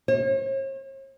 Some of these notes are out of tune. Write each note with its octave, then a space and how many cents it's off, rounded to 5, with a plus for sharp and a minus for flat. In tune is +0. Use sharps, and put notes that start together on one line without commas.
C#5 -45